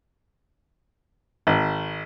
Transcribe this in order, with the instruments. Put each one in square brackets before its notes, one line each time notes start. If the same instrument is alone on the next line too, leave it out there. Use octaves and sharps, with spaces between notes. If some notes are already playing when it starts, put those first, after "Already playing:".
[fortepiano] G#1